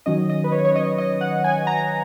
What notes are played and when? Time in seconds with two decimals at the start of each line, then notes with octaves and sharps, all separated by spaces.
0.06 D#3 F#3 C#4 D#5
0.29 D#5
0.44 B4
0.52 C#5
0.65 C#5
0.76 D#5
0.98 D#5
1.21 F#5
1.44 G#5
1.67 A#5